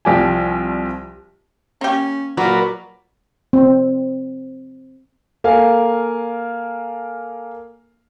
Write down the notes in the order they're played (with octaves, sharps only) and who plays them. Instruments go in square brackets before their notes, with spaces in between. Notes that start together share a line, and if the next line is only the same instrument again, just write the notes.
[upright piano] C2 F3 G4 D5 G#5
[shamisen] A#3 G4 [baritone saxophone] C#4
[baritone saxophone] A#2 [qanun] F#3 [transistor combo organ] A#4 B4 D5
[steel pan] C4
[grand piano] A#3 A4 A#4 F5 G#5